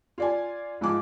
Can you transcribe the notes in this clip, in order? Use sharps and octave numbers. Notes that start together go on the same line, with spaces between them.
F4 D5 G#5
G#2 F3 G#5 D6